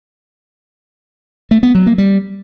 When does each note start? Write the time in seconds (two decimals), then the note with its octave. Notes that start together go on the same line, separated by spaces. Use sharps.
1.51 A3
1.63 B3
1.75 F#3
1.86 A#3
1.98 G3